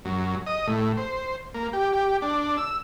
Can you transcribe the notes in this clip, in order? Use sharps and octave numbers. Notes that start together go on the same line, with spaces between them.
F#2
D#5
A2
C5
A#3
G4
G4
D4
E6